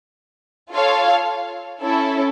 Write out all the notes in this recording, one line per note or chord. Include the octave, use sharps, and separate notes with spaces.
F4 A4 C#5 F5
C#4 E4 A4